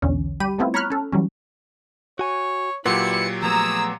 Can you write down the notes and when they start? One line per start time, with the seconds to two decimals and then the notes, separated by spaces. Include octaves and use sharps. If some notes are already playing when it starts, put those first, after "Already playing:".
0.02 B1 E2 D3 C#4
0.40 G3 G4 B5 D#7
0.58 G3 A3 B3 C4 E4 F4
0.74 C#5 A#5 B5 C#6 F6 F#6
0.90 C#4 A4
1.12 E3 F#3 G3 C#4
2.19 F#4 C#5 G#5
2.86 A#2 F#3 E4 G4 B4 F#5 C6 C#7
3.43 F3 A3 B3 G#4 A#5 E6